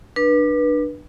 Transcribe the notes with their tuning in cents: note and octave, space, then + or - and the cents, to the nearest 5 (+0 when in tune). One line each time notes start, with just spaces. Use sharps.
D4 +25 B4 -25